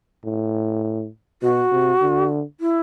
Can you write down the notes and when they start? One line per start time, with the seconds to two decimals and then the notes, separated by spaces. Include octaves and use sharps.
0.25 A2
1.42 B2 F#4
1.72 C3
2.02 D3
2.60 E4